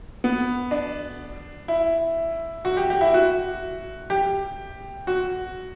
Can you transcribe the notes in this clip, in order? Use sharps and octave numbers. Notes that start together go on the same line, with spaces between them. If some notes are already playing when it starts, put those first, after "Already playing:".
B3
D4
E4
F#4
G4
G4
E4
F#4
G4
F#4